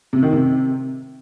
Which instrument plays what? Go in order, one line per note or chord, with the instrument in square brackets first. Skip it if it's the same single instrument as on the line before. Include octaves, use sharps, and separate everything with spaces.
[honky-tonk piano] C3
D#3
C3